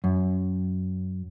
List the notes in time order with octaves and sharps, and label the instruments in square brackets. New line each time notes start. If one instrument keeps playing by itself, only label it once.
[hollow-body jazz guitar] F#2